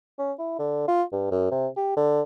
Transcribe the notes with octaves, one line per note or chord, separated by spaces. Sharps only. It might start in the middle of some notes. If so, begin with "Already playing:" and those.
C#4
E4
D3
F4
G2
F#2
C3
G4
D3